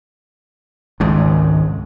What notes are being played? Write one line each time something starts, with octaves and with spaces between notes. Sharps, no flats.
G#1 C#2 G#2